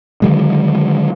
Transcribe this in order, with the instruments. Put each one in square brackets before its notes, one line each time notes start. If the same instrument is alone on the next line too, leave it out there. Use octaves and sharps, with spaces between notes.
[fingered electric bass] D3 D#3 F#3 G#3